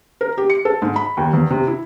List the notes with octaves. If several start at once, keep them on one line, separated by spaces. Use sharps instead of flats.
A#4
G4
C#7
A4
G#2
B5
D#2
E2
C3
E4